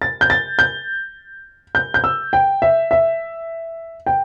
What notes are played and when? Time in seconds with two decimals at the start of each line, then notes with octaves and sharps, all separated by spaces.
0.02 A6
0.21 G6
0.30 A6
0.59 G6
1.75 G6
1.94 G6
2.04 E6
2.33 G5
2.62 E5
2.91 E5
4.06 G5